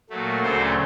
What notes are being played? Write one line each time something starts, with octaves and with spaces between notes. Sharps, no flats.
A#2 F#3 A3
D2 C#3 F#3 A3 C5